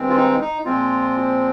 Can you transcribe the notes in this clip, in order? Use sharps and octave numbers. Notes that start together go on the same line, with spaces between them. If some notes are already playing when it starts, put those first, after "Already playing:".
Already playing: G2 D#3 G#3 C4
F4
D#4
D#4
A#2 F3 G#3 C4 F4